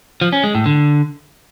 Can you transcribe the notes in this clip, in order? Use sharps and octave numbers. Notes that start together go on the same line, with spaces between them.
F3
C#4
G#3
A2
D3